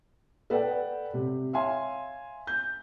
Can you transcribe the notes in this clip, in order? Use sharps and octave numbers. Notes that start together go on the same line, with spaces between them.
A4 B4 D5 F#5 G5
C3
C#5 E5 F5 G#5 C6
G6